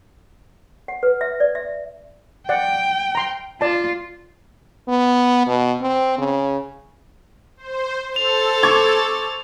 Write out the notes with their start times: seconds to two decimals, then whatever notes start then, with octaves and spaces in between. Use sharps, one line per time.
0.88 F#5
1.03 B4
1.21 E5
1.40 D5
1.55 E5
2.49 D5 F#5 G5
3.15 A#5 C6
3.61 F4 D5 A5
4.88 B3
5.47 B2
5.81 C4
6.18 C#3
7.57 C5
8.16 A4 C5 A6 F7
8.63 C#6 D6 G#6